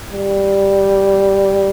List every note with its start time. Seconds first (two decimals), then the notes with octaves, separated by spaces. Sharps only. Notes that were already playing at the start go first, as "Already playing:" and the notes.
0.12 G3